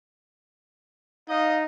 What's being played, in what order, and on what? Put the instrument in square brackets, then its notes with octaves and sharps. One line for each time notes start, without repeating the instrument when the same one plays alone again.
[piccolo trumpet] D#4 [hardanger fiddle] D#5 [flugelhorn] F5